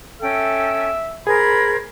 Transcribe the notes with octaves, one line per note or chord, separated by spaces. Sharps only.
C#4 A4 E5 G5
G#4 A#4 C5 B5 G#6